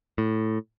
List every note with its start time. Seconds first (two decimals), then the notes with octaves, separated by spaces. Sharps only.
0.18 A2